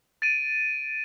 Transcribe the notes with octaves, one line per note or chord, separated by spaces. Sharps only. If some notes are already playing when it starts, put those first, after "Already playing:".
A6 D7 D#7